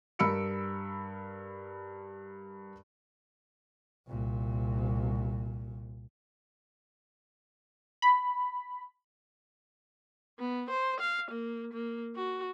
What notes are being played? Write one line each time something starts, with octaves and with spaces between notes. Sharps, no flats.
G2 A#4 B5 E6 C#7 D7
C2 A#2
B5
B3
C5
F5
A#3
A#3
F#4